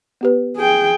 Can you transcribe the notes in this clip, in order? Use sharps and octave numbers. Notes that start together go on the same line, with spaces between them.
B3 G4 B4
G#4 G5